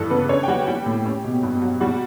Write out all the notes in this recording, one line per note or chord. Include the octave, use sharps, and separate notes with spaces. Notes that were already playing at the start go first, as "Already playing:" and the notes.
Already playing: G2 E3 A4
C#3 B3 B4
C#4 D4 C#5
G5
G3 F#4 F#5
G3 G4 G5
A2
C#4
B2
G2
F#3
G3 F#4 F#5